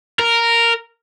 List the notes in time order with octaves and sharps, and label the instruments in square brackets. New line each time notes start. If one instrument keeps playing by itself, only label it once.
[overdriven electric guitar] A#4